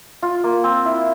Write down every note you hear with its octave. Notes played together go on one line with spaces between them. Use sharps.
F4
A#3
C4
E4